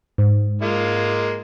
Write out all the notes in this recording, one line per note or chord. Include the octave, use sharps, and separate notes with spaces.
G#2
G#3 A#3 F4